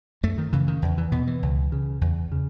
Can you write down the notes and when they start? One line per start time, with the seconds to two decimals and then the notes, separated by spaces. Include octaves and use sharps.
0.23 F#2 A3
0.38 D#3
0.53 C#3 E3
0.68 D#3
0.82 E2
0.98 E3
1.12 B2 B3
1.27 E3
1.43 C#2
1.72 C#3
2.01 E2
2.32 C#3